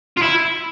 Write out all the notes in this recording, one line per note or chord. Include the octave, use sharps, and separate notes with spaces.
F4
E4